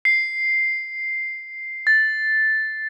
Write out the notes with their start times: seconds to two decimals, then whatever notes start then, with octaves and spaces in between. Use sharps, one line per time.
0.05 C7
1.87 A6